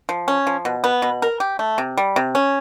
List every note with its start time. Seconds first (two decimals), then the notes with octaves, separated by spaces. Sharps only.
0.09 F3
0.28 C#4
0.47 F3
0.65 B2
0.84 B3
1.02 B2
1.22 A#4
1.40 G4
1.59 A3
1.78 C3
1.97 G3
2.16 C3
2.35 C#4